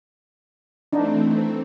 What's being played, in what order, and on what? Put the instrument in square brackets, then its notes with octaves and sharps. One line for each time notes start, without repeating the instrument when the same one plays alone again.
[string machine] E3 A3 C4 [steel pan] D4 D#4